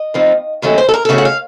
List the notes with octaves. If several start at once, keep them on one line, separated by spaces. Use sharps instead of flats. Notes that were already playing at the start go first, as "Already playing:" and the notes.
Already playing: D#5
A2 F3 C4 D#4
D#2 D#3 F#3 A3 C#4
C5
A4
A#4
A4
C#3 A3 C#4 F#4
F#5
F5